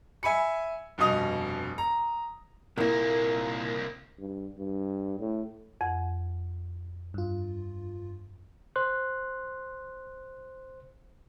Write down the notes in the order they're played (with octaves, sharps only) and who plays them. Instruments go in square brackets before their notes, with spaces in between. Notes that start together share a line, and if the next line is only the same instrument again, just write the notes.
[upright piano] E5 G#5 B5 C#7
F1 G2 B2 D#5 D#6 F7
A#5
[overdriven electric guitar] C2 A#3 [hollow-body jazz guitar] A#2 E4 [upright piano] A#4
[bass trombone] G2
G2
A2
[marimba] F2 F#5
[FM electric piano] G2 F4
[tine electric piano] C5 C6 F#6